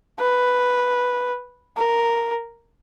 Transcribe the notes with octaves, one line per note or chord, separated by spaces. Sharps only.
B4
A#4